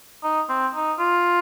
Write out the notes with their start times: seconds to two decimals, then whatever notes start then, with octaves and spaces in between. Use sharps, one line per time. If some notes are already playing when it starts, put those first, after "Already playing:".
0.24 D#4
0.50 C4
0.75 D#4
1.00 F4